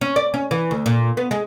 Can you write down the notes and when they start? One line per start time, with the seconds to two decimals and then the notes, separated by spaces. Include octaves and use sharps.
0.01 C#4
0.16 D5
0.34 C#4
0.51 E3
0.71 D2
0.86 A#2
1.17 B3
1.31 G#3